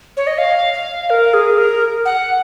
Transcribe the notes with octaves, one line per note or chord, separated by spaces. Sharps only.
C#5
D#5
F5
F5
A#4
G#4
A#4
F#5